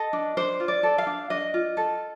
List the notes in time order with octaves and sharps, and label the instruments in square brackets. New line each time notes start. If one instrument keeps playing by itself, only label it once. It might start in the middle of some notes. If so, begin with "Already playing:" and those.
Already playing: [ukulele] A4 D#5
D4
D4 C5
F4
D5
A4
F5
D4
D4 D#5
F4
A4